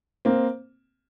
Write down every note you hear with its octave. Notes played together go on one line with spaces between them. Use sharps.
A#3 C4